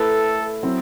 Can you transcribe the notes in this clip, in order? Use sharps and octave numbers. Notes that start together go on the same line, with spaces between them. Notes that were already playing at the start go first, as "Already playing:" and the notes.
Already playing: A3 E4 A4 B4
F#3 C4 E4